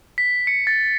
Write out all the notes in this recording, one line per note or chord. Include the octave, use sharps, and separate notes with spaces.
B6
C#7
A6